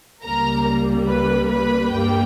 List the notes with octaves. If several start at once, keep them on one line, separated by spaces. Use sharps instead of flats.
C#2 C#3 G3 A#3 A#4 A#5
B4 B5
B4 B5
G2 G3 A#3 G4 G5